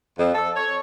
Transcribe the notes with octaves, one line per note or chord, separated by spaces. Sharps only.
F2
A4
C#5